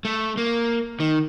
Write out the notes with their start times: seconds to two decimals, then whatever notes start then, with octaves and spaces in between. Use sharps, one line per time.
0.05 A3
0.37 A#3
1.00 D#3